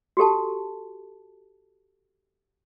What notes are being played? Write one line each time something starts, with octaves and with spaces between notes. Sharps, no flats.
F#4 G4 A4 A5